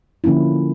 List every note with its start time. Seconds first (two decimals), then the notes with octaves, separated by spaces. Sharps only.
0.24 D3 F3 A#3 C#4 E4